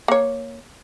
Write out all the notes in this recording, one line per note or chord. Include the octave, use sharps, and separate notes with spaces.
A#3 C#5